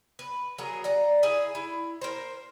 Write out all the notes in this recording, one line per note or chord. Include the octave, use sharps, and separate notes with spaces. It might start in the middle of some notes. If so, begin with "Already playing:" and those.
B4
F#3 G#4 A#4
D5 F#5 A#5
E4 G#4 E5
E4
A#4 C5